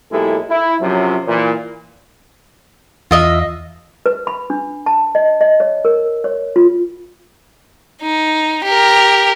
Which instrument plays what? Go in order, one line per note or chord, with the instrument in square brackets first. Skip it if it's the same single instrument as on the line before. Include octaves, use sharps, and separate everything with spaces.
[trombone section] B1 G#3 A#3 E4 G4 A4
E4
F#2 C3 F3 F#3
A#2 E3
[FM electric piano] E2 A#6 [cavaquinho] F4 D#5 E5
[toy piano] B4
B5
D4
A5
D#5
D#5
C#5
A#4
C#5
F4
[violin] D#4
G4 A#4